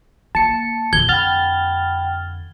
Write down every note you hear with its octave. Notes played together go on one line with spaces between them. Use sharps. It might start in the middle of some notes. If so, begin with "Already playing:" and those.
A#3 A5 C#7
F2 D3 G#6 G7
F#5 G5 B5 F6 A6